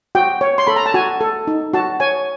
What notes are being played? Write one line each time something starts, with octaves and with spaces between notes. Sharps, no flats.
F#4 G5
C#5
C6
A4 B5
A#5
A5
F#4 G#5
A4
D#4
F#4 A5
C#5 G#5